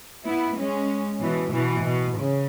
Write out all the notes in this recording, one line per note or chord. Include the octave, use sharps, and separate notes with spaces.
B3 E4
G#3 C#4
B2 E3
B2 E3
B2
C#3